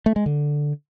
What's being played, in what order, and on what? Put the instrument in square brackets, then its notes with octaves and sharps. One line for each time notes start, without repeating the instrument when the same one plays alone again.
[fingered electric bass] A3
G#3
D3